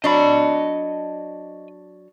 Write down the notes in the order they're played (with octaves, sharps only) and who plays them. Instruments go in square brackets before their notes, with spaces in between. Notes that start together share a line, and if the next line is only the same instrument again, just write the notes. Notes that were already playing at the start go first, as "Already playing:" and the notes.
[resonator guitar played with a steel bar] F#3 D4 [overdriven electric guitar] D#5 B5